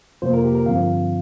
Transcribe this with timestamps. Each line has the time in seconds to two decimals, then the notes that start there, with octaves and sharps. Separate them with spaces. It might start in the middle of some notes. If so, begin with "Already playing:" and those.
0.22 F2 C3 A#3 F4 C5
0.33 A#4
0.44 G4
0.55 A#4
0.66 G2 D3 F3 C4 F4 F5